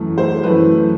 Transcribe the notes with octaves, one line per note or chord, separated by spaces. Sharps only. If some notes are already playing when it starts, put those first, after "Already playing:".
Already playing: F#2 E3 A3
C5
F#2 E3 A3 B4